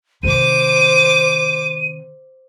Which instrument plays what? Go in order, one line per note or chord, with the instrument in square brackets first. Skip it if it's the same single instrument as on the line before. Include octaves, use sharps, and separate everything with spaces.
[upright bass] C3 D#3 [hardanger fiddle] C5 D6 [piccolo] D#7